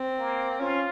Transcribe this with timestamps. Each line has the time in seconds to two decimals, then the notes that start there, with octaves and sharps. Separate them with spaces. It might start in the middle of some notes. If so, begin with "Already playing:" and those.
Already playing: C4
0.19 A#3
0.60 C#4 F4